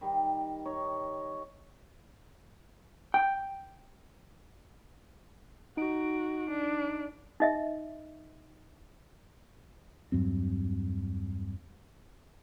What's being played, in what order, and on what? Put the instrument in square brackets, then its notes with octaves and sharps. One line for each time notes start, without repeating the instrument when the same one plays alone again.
[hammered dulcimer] D#3 G3
D#4 C#5 D#5
[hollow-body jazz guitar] G5
[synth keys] D#4 D7 [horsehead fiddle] F#4
[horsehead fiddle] D4
[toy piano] D#4 D#5 E5
[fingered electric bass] E2 G2 F#3 C4